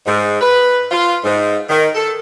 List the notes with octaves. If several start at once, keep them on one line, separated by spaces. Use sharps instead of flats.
G#2
B4
F4
G#2
D#3
A4